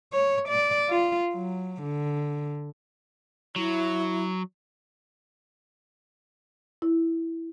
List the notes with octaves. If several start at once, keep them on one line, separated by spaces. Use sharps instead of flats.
C#5
D5
F4
F#3
D3
F#3 E4
E4